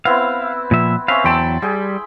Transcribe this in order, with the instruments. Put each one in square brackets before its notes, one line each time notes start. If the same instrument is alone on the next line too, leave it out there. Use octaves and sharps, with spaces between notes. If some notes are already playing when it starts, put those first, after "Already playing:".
[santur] B3 C4 E4 [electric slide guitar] F5
[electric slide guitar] A#2 F3 E5
[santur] C4 C#4 E5 [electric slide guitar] B4 F5
[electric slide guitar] E2 F#3 G5 [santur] A5 B5 C6
[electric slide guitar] G3 [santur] G#4 G5